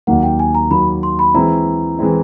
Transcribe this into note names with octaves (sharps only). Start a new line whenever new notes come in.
D#2 D#3 F#3 A#3 F#5
G5
G#5
A#5
D#2 D#3 F#3 A#3 B5
C6
B5
E3 G#3 C4 E4 A#5
E3 G#3 C4 E4